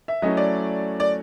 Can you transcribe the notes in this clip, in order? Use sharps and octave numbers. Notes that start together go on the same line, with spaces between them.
E5
F#3 A3 C#4 E4 D#5
D5
D5